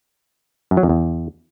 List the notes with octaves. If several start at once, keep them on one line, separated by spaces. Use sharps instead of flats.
F#2
F#3
F2
E2